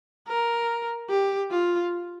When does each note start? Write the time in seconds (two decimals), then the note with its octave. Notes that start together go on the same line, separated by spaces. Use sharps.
0.28 A#4
1.09 G4
1.51 F4